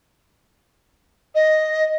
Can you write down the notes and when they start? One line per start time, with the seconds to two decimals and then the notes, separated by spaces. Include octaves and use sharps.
1.35 D#5